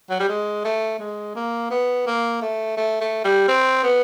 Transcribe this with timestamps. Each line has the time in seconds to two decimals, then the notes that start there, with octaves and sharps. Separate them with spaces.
0.10 F#3
0.20 G3
0.29 G#3
0.65 A3
1.00 G#3
1.36 A#3
1.71 B3
2.07 A#3
2.42 A3
2.77 A3
3.01 A3
3.25 G3
3.48 C4
3.83 B3